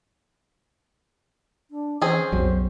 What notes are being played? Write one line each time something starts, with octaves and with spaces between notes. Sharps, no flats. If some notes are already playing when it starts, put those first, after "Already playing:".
D4
E3 C4 C#4 G#4 C5
B1 F2 B2 F#3